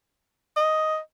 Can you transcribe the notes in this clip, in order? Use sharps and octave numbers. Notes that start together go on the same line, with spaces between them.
D#5